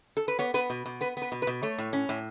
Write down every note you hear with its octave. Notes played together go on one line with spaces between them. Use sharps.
A4
B4
B3 C#5
B3 B4
B2
B2
B3 B4
B3 B4
B2
B4
B2
A3 C#5
A2
C#4
A2